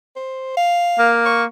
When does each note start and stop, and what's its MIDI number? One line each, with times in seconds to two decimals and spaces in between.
0.16 0.54 72
0.57 1.14 77
0.99 1.45 58
1.26 1.44 85